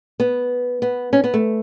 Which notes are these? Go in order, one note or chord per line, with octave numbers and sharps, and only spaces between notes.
B3
B3
C#4
B3
A3